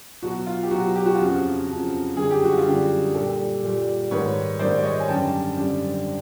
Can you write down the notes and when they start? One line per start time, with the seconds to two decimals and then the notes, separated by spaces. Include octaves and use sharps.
0.22 B2 F#3 F#4
0.47 F4
0.63 G4
0.71 F#3 F#4
0.75 B2
0.95 G4
1.06 F#4
1.15 F4
1.20 F2 C#3 F3 F#4
1.68 F2 C#3 F3
2.16 F#2 D3 G3 G#4
2.31 G4
2.44 F#4
2.58 F4 G4
2.66 F#2 D3 G3
3.14 A#2 G3 G4 A4
3.63 A#2 G3
4.11 G#2 D#3 G3 B4 C#5
4.59 G#2 D#3 G3 C5 D5
4.78 D5
4.84 C#5 D#5
5.00 G#5
5.08 F#2 D3 G3 G5 A5
5.57 F#2 D3 G3